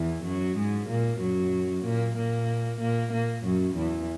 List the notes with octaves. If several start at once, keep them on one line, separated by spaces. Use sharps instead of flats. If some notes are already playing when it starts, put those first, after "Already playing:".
Already playing: E2 E3
F#2 F#3
G#2 G#3
A#2 A#3
F#2 F#3
A#2 A#3
A#2 A#3
A#2 A#3
A#2 A#3
F#2 F#3
E2 E3